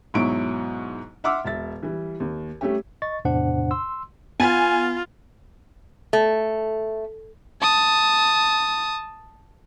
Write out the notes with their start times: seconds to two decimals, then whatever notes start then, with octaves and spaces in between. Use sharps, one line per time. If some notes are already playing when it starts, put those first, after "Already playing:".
0.14 G#2 B2 F#3 E4 C#6 D7
1.24 E5 F#5 C6 D6 E6 F6
1.44 E1 E5 A6
1.83 E3 G3
2.20 D#2
2.61 G3 A3 C#4 G4
3.02 D#5 C#6 A6
3.25 E2 A2 C3 D4 C5 F#5
3.71 C6 E6
4.40 B3 F4 G#5 A6
6.13 A3
7.62 A5 D#6